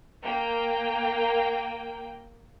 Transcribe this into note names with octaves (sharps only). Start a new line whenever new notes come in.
A#3 G5